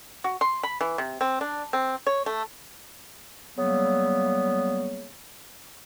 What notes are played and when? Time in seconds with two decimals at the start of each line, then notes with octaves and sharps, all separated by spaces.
0.24 F#4
0.41 C6
0.63 B5
0.81 E3
0.98 C3
1.21 C4
1.41 D4
1.73 C4
2.07 C#5
2.26 A3
3.56 C#3 F#3 G3 A#3 B3